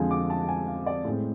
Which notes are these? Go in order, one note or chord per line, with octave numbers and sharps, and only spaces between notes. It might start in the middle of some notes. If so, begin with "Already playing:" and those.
Already playing: F2 D3 F3 G#3 G#5
D6
A5
G#5
F5
D5
A2 G#3 C4